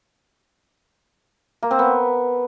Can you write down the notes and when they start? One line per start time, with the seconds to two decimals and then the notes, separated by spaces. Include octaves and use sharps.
1.63 A#3
1.71 C4
1.79 B3